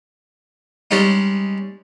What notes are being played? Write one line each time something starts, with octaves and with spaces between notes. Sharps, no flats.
G3 G#3 C#4 D#4